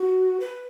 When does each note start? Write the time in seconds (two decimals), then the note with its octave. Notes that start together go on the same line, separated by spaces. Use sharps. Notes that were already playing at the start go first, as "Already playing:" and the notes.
Already playing: F#4
0.40 B4